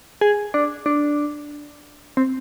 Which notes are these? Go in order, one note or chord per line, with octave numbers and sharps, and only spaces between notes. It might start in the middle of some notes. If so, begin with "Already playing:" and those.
G#4
D4
D4
C4